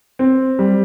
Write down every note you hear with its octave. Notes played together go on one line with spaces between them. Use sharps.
C4
G3